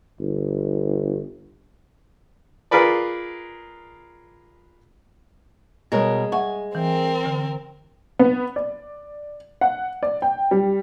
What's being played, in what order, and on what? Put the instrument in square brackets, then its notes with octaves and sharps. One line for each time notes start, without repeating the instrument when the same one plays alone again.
[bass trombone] G1
[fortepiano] F4 G#4 A#4 B4 D5
[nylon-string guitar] B2 A#4 C#5 [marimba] G3 [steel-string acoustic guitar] G#3
[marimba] E5 F#5 C#6 [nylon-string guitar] G#5
[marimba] E3 [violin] C4 A#4
[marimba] D3
[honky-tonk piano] B3
D5
F#5
D5
G5
G3